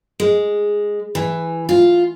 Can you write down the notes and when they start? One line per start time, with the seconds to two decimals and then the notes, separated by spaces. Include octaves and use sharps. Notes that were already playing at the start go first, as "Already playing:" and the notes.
0.20 G#3
1.15 E3
1.69 F4